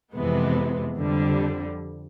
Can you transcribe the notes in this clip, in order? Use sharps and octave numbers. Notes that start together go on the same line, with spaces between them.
F2 C3 E3 G#3 B3
F2 D3 G3